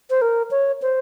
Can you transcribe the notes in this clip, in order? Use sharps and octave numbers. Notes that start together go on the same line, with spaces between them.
C5
A#4
C#5
C5